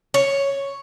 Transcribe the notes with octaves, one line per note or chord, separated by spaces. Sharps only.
C#5